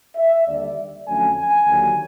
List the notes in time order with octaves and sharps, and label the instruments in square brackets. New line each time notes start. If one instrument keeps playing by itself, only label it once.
[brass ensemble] E5
D#2 D3 G3 D5
F2 D3 F#3 A3 C#4 G#5
G#5
D#2 D3 F#3